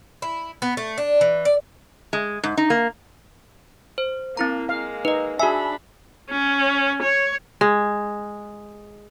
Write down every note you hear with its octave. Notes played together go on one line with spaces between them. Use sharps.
E4
B3
A3
D4
E3
D5
G#3
G#2
D#4
A#3
C5
A#3 C4 E4 A#5
G#3 A#3 F5
D#4 B4 D#5
D4 F#4 G#4 E5 G#5 B5
C#4
C#5
G#3